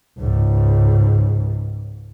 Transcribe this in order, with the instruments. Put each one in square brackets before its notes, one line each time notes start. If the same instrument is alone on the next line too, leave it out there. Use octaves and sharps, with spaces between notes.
[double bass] C#2 G#2